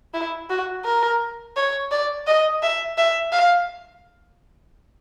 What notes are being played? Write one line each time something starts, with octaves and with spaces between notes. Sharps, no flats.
E4
F#4
A#4
C#5
D5
D#5
E5
E5
F5